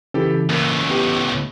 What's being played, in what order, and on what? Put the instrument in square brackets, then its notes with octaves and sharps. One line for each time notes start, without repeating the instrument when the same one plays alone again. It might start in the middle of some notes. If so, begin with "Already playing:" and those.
[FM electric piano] C#3 E3 [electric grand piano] E4 G4 A4
[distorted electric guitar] C#2 A2 [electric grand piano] A#3
[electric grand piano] B3 G4